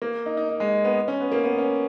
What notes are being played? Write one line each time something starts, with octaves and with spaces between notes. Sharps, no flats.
A#3
D#4
D#4
D#4
G#3
B3
C#4
B3
A#3
B3
C#4